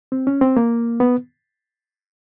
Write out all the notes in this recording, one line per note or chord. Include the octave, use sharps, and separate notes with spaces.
C4
C#4
C4
A#3
B3